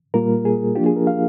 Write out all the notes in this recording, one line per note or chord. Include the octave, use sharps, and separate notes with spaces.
A#2 G3 A#3 F4 A#4
G#4
F3 A#3 D4 F4 G4
G#4
A#4
F5